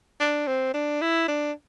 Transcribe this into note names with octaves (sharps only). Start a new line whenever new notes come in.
D4
C4
D4
E4
D4